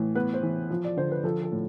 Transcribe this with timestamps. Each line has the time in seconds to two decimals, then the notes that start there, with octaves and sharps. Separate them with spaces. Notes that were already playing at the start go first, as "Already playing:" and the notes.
Already playing: A2 E3
0.15 B3 B4
0.33 C5
0.43 E3
0.70 F3
0.84 D5
0.97 D3 C5
1.12 B4
1.24 F3 A4
1.42 A4
1.52 A2